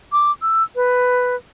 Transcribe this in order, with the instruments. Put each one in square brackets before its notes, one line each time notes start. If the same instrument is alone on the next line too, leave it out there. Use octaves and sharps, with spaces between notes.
[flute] D6
E6
B4